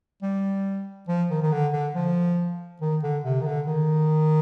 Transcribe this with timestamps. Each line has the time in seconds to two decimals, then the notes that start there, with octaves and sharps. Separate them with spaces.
0.22 G3
1.08 F3
1.30 D#3
1.43 D#3
1.52 D3
1.73 D3
1.95 F3
2.81 D#3
3.03 D3
3.24 C3
3.41 D#3
3.46 D3
3.67 D#3